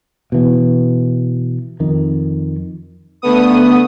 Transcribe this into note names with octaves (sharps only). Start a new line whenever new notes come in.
B2 E3
F2 D#3
D3 A3 B3 D#6